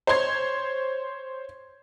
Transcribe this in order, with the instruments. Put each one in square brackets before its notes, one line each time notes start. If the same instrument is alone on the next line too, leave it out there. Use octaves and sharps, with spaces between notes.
[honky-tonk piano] C5 C#5 C6 G#6